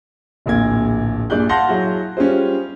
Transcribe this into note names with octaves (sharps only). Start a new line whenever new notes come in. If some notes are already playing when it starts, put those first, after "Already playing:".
D1 A#1 A#3 G#6
G2 A#2 G#4 D5 F#6 G6
F5 F#5 A5 C6 G6 A#6
F#3 E4 G#4
G3 C#4 F4 G#4 C5